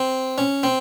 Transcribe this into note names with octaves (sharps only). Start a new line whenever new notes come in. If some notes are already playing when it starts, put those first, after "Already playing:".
Already playing: C4
C#4
C4